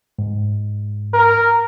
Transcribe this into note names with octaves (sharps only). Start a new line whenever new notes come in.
G#2
A#4